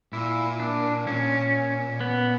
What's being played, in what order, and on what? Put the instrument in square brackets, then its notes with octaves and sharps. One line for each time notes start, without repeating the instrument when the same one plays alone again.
[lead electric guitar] A#2 [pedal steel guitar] E4
[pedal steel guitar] D4
[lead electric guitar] A#2 [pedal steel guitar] C#4
[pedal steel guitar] B3